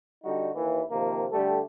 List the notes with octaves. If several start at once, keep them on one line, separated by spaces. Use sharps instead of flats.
D3 G3 D#4 F#4
D#2 E3
C3 D#3 F3 A#3
D3 G3 A3 G4 A4